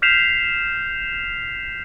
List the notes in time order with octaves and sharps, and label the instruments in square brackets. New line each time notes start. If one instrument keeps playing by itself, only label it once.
[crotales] F6 G6 B6 C7 E7 F7